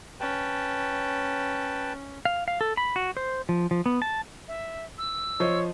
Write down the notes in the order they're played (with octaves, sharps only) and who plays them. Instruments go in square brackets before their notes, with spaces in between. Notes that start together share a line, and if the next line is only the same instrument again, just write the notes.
[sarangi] C#4 [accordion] B4 G5 A5
[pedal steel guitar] F5
F5
A4
B5
F#4
C5
F3
F3
B3
A5
[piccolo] E5
E6
[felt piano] F3 C5 D#5 [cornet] C#5